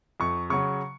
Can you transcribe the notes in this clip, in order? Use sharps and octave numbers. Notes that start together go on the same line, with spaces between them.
F2 C#6
C#3 F#3 C#6